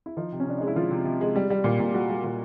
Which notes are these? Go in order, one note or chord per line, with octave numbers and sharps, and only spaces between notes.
E4
F3 D#4
C3
C#4
C3 D4
G#3 D#4
E4
F3 F4
C3
C3
G#3
G3
G3
A#2
A#2
G3 F#4
G3
A#2